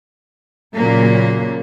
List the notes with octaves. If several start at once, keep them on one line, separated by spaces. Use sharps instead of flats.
A#2 C#3 F#3 A#3